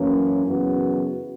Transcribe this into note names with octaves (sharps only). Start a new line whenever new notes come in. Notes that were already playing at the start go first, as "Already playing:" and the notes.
Already playing: F#2 E3 A#3 C#4
F#2 C#3 E3 B3 F#4